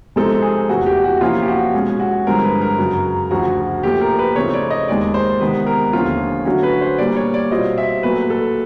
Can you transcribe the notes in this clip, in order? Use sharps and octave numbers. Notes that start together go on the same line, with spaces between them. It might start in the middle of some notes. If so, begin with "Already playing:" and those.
C3 F3 G#3 C4 D#4 A4
G#4
E2 C3 E3 A3 F#4
G4
F#4
C3 F3 A#3 C#4 E4 F4
G4
F#4
B2 G#3 C#4
F#4
G2 D3 F3 G#3 C4 A#4
B4
A#4
F#2 C#3 F#3
D2 C#3 F3 F#4
A#2 F3 A3 G4
A#4
B4
C#3 F3 A3 C4 D#4 C#5
D5
D#5
D#2 D#3 G#3 D5
C5
C3 D#3 G#3 B3 B4
A#4
D#2 D3 F3 A3 C#4 F4
D3 F#3 A3 C#4 F#4
B4
C5
A#2 G3 A#3 D5
C#5
D5
B2 G3 C4 F4 D#5
E5
A#2 F#3 A3 B4
A4